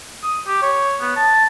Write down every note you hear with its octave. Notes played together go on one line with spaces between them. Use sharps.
D#6
G4
C#5
B3
A5